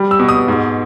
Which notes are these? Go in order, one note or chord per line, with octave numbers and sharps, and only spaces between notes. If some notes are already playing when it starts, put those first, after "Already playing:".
Already playing: G3
E6
B2
D#6
G#2